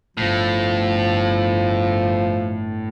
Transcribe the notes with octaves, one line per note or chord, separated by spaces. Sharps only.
G1 A2 F3